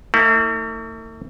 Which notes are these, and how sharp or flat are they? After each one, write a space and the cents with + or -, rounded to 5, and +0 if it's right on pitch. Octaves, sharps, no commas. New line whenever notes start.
A3 +45 E4 -35